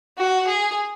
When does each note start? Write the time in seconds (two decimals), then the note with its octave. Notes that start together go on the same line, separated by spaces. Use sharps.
0.18 F#4
0.47 G#4